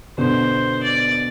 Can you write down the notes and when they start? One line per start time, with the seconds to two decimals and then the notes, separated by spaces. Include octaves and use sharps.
0.18 B2 D3 C5
0.83 D5